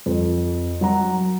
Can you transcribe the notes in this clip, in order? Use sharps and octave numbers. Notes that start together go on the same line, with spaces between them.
F2
F#3 F#5 A#5